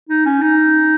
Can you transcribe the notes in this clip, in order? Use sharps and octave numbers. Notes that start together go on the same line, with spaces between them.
D#4
C#4
D#4